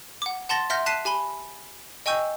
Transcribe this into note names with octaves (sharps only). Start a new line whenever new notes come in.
F#5 D6
F#5 A5 C6 A6 A#6 F#7
E5 F#5 C6 F6 G6 A#6
A5 F#6 B6 C7 D#7 E7
G4 G#5 B5 G7
D#5 G5 G#5 C#6 E6 G6